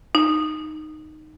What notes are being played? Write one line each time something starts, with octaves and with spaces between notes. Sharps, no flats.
D#4